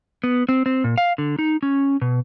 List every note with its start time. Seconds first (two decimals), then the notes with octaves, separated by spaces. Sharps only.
0.24 B3
0.49 C4
0.66 C4
0.84 A#2
0.98 F5
1.18 D3
1.39 D#4
1.63 C#4
2.02 B2